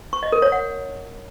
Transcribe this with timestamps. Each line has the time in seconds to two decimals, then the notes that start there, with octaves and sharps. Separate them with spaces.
0.13 C#6
0.23 D#5
0.32 A#4
0.42 C#5
0.52 F#5